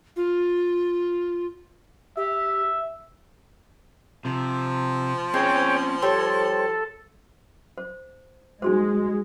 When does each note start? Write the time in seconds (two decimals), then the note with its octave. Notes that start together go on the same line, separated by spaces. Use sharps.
0.16 F4
2.17 G4 E5
4.25 C3 F3
5.34 G#3 C4 C#4 C#5 G5
6.02 G3 C4 A4 C#5 C6
7.78 C5
8.62 G#3 D#4 F#4 C5